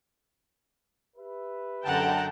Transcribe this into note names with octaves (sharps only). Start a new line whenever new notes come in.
G4 B4 E5
F#2 D3 F#5 G5 A5 A#5